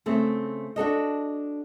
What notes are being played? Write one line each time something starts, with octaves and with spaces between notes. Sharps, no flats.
C#3 A3 C4
D4 F#4 A4 D#5